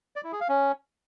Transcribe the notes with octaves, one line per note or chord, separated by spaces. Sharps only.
D5
E4
G#4
F5
C#4